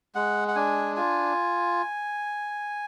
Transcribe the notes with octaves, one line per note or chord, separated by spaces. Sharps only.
G#3 F#5
F#5
D4 G#5
F4 G#5